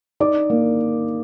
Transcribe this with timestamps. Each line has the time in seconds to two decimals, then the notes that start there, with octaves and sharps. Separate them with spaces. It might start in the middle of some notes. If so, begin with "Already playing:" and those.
0.20 D#4 D5 D6
0.50 A#3